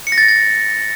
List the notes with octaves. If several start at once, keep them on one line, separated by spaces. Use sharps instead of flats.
C#7
A#6
A6
A#6
A6